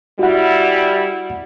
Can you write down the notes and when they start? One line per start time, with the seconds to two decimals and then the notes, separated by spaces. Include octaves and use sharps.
0.19 G3 E4 F#4 F#5